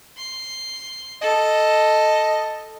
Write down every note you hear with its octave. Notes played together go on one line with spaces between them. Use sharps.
C6
A4 D#5